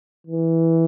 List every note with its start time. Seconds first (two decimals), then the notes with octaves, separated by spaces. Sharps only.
0.27 E3